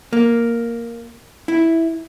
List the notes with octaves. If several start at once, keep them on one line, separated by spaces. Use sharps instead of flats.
A#3
E4